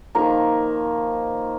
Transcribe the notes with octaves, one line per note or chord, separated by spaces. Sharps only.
D#3 F3 A#3 A#5